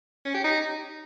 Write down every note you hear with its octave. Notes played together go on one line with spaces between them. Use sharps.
C#4
G4
D#4